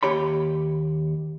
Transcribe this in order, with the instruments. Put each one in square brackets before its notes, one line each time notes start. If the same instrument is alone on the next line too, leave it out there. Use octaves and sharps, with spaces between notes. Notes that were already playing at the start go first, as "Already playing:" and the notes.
[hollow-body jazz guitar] D#2 G4 C#5 B5